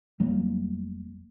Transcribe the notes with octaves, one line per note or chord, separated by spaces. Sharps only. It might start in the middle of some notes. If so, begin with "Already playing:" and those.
F1 F#3 G3 A#3